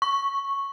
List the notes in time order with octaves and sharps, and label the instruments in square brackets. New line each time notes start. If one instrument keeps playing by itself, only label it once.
[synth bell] C#6